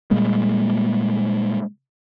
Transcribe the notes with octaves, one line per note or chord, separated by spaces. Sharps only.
A#2 G3 G#3 A#3